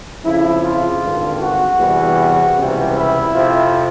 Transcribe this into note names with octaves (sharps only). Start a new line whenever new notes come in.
F2 C#3 F3 E4
F4
G#1 G2 D3
F#4
E2 C3 E3 G3
C#2 C3 E3 G3
E4
F2 C3 F3